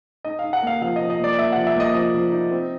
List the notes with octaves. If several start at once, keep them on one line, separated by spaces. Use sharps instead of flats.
D#4 D#5
D#4 F5
F#5
A#3 F5
F3 F5
F3 D#5
D#5
A#3 D5
A#3 E5
F#5
F3
E5
A#3 D#5
F3 D#5
F3
D#4
C4